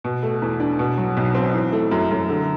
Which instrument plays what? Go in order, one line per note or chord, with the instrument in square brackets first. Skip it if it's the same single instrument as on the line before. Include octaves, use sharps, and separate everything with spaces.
[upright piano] B2
A3
E2
D4
B2
F#3
B1
C4
E3
A3
F#2
F#2
D3